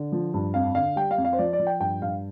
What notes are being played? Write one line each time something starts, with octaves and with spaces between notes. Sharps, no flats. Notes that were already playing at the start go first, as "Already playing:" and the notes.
Already playing: D3
F3
G2
F2 F5
D3 F5
G3 G5
F5
F2
F5
C5
F3 D5
D5
F3
G5
G2 G5
G2 F5